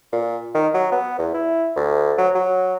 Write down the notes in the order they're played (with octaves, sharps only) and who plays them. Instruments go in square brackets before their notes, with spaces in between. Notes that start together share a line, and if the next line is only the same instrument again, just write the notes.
[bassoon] A#2
D#3
F#3
B3
E2
E4
D2
F#3
F#3